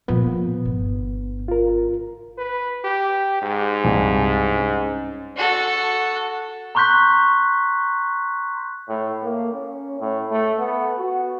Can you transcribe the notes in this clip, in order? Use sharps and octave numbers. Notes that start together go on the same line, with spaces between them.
A#2 F3 B3
G1
F4 A#4
B4
G4
G#2
C2 G2 G#5
C#4
F#4 A4
A#5 C6 C#6 F#6 G6 B6
A2
A#3
C#4
A2
A3
B3
F#4